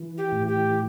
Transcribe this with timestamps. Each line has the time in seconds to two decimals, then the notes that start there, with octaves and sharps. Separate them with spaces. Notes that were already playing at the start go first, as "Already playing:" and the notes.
Already playing: E3
0.18 G4
0.32 A2
0.47 G4